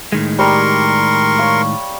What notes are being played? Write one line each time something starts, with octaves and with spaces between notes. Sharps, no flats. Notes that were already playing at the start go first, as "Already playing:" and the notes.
A2 D#3 G#3
G3 A#4 A#5 C6 C#6
C#5 F5